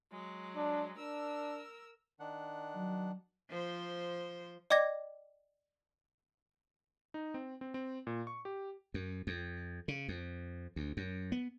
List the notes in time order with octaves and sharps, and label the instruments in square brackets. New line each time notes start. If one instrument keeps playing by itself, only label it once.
[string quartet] F#3 G#3
[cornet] D4
[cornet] D4 [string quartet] A#4 E6
[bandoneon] D#3 D4 F#5
[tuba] F#3
[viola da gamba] F3 C5
[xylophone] D5 D#5 G5 D6 G#6 A#6
[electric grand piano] D#4
C4
C4
C4
A#2
C#6
G4
[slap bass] F#2
F2
C#3
F2
D2
F#2
B3